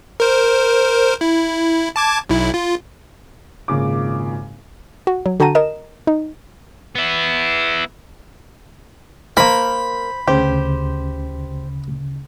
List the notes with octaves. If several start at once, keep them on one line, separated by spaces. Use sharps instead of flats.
A#4 C5
E4
A5 D6 G#6
B1 E4
F4
G#1 A#2 C#3 D6
F#4
F#3
D3 F#4 G5 A5 A#5 D#7
A#4 D#5 E7
D#4
B3 E4
A#3 A#4 C5 B5
D2 C#3 G4 C5